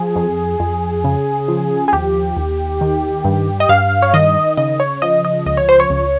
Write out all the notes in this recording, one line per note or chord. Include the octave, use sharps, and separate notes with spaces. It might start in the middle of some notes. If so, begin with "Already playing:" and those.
Already playing: F3 G#4
F2
F2
C#3
F3
G#4
D#2 G4
D#2
D#3
G2
D#5
G2 F5
C#5
D#3 D#5
C#3 D#5
C#5
F3 D#5
D#5
C#2 D#5
C#5
C5
C#5
C#2